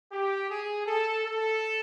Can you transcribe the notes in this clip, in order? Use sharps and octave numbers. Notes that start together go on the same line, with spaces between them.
G4
G#4
A4
A4